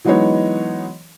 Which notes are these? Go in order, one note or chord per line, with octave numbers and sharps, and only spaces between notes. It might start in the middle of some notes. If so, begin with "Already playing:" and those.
E3 F#3 G#3 B3 D#4 C#5